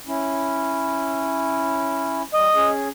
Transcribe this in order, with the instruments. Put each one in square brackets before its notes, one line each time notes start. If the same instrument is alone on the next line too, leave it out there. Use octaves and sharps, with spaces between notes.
[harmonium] C#4 E4
[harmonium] G3 [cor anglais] D#5
[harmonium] C#4 G#4